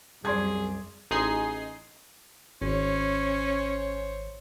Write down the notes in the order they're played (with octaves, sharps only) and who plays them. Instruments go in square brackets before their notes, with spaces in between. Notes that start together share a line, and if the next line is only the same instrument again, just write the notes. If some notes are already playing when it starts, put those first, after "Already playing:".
[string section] C2 F#2 [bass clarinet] G#4 [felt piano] D5 C6 G#6
[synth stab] A1 D#4 G#4 C6 C7
[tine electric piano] G#1 [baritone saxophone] C#4 [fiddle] C5 C#5